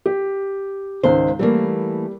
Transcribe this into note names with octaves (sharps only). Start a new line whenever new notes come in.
G4
C#2 G#2 D#3 C5
E3 G3 A3 A#3